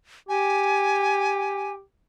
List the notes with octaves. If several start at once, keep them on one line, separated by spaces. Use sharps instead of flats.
G4 G#5